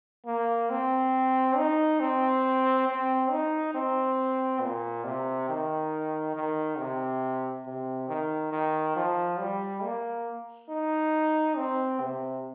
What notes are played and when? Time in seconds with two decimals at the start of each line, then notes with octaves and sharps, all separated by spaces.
0.26 A#3
0.70 C4
1.57 D#4
2.00 C4
2.87 C4
3.31 D#4
3.74 C4
4.61 A#2
5.04 C3
5.49 D#3
6.35 D#3
6.78 C3
7.66 C3
8.09 D#3
8.52 D#3
8.96 F3
9.39 G3
9.83 A#3
10.69 D#4
11.57 C4
12.01 C3